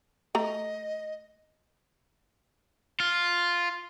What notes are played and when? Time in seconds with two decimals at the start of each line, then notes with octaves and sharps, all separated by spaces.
0.35 A3 D#5 A#5
3.00 F4